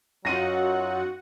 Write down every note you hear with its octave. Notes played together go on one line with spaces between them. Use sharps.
F#2 F#3 D#4 F4 F#4 F#5 A#6 D#7